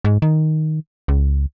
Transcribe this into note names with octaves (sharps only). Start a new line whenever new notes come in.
G#2
D#3
C#2